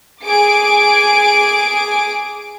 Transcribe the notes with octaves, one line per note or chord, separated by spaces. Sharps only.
G#4 G#5 D6 D7